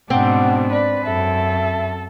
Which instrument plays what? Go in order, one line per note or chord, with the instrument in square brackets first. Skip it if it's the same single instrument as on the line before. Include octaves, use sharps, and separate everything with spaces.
[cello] G#2 B2 [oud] C4 [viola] D4 [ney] F#5
[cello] B4 [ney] D5
[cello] F#2 [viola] A4 [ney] E5